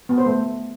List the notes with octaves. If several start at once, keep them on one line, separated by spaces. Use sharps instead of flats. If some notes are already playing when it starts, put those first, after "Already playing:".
B3
C5
A3